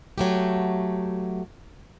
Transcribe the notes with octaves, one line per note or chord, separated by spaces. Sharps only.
F#3 A3 G4